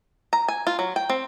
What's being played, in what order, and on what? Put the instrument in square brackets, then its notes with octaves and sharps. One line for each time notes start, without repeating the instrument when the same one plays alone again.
[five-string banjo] A#5
G#5
F4
F#3
G5
C4